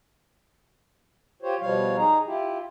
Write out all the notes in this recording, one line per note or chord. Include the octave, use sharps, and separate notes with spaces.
F4 G4 C5 C#5
B2 F3 G3 C#5 F5
D#4 G#4 A#5
E4 F4 G4